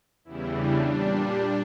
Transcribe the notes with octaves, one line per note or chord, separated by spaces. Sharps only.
E2 C#3 E3 G3 E4
D4
A#2 G3